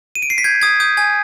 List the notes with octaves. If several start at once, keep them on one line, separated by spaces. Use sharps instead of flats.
D#7
D7
C7
B6
G6 G#6
D#6 G#6
D#6 G6
G#5 G#6